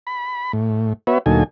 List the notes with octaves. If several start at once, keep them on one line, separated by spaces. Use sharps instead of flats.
B5
A2
B3 F#4 B4 C#5 E5
D2 A#2 F#3 D#4 A4 G#5